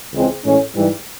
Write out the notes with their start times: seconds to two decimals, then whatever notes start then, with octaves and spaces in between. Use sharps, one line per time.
0.14 C#2 C#3 E3 G#3 C4
0.44 A2 E3 G#3 C#4
0.75 G#2 E3 G3